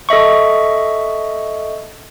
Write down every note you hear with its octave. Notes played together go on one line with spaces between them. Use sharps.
A4 D#5 E5 C#6